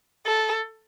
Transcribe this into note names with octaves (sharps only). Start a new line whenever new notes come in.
A4